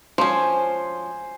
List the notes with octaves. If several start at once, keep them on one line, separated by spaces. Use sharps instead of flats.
F3 C#4 C5 G#5